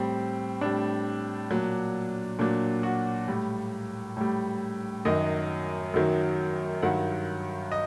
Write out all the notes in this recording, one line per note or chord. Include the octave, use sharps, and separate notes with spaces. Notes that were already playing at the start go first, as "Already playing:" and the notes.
Already playing: A2 G3 C4
A2 G3 D4
A#2 F#3
A#2 F#3 D4
F#4
A2 G3
A2 G3
F#2 D#3 F#3 D#5
F#2 D#3 F#3
G2 D#3 F#3 F#5
D#5